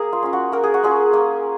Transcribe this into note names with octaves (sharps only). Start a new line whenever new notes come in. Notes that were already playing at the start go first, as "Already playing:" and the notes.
Already playing: A#3 G#4 A#4
F4
C#4 F4
F#4
A#3 A#4
G#4
F#4
C#4 F4 G#4
A#3